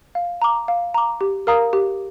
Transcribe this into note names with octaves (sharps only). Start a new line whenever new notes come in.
F5
A#5 D6
F5
A#5 D6
G4
A#4 F5 A#5 D#6
G4